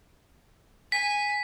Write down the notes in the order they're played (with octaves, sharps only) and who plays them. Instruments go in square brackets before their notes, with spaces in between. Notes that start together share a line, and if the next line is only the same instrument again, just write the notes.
[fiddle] G#5 [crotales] B6